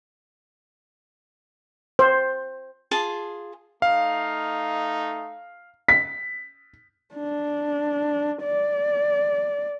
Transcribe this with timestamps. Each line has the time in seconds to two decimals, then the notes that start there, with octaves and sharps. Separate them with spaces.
1.99 C5
2.91 F4 G#4 A5
3.82 A3 D#4 F5
5.88 B6
7.15 D4
8.43 D5